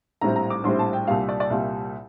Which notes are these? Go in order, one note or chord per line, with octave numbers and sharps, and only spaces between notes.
A#1 A2 G3 C4 A#5
A#5
D6
A#1 A2 G3 C4 C6
A5
G5
C2 A#2 G3 F5
D5
D5
C2 A#2 G3 E5